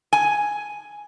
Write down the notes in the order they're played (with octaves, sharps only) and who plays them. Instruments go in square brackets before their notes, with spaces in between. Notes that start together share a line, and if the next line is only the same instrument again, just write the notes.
[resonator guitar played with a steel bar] G#5